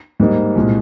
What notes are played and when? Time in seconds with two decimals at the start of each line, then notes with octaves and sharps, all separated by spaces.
0.20 G#2 G3 A#3 D#4
0.55 C2 A#2 G#3